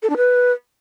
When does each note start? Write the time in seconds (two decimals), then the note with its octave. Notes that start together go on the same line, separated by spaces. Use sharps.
0.02 A4
0.10 D4
0.17 B4